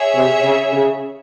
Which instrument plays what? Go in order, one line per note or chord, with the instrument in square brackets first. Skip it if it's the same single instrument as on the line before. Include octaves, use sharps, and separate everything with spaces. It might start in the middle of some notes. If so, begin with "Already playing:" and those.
Already playing: [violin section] G#4 C#5 E5
[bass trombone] C3
C#3
C#3